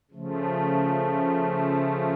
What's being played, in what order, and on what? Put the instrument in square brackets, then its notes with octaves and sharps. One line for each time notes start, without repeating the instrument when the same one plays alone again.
[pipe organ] C#3 F3 A3